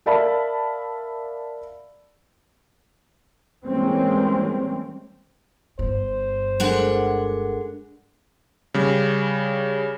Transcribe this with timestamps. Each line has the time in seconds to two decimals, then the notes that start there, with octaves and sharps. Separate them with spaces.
0.06 A#4 D5 E5 F5 A5 B5
3.66 E3 G3 G#3 A#3 C4 C#4
5.79 G1 G2 C5
6.60 G#3 D4 A4 A#4 F#5
8.74 C#3 G3